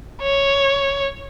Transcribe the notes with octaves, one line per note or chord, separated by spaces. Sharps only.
C#5